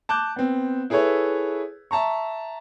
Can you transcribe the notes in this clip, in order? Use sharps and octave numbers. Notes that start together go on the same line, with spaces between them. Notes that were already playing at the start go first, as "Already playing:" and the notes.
A5 D6 F#6 G6
B3 C4
E4 G#4 A4 B4 C#5 E5
E5 A5 A#5 C#6